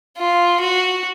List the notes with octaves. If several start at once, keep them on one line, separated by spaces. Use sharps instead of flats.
F4
F#4